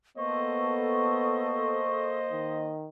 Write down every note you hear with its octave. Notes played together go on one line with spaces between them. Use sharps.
A#3 B3 A4 C5 D#5 C#6
D#3